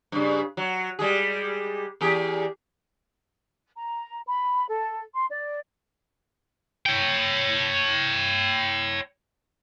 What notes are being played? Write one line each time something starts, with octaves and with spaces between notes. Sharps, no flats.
G2 C#3
F#3
G3 G#3 G#4
E2 G4 G#4
A#5
B5
A4
C6
D5
C#5 G5